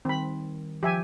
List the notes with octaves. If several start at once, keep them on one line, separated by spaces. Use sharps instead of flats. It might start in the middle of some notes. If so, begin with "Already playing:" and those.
D#3 G3 C4 B5
F3 G4 E5 G#5